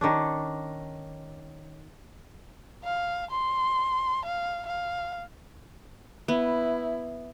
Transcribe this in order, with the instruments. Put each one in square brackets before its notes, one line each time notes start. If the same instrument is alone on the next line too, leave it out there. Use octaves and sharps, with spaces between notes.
[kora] D#3 C#4 D4
[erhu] F5
C6
F5
F5
[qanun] B3 [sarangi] E4